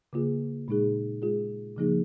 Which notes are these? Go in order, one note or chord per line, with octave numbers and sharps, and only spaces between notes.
C#3 A#3 F4 G#4
A#2 G#3 D#4 G#4
G#3 F4 G#4
C#3 F3 A#3 D#4 G#4